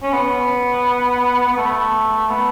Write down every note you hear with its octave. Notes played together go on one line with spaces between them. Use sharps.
C#4
B3
B3
A3
B3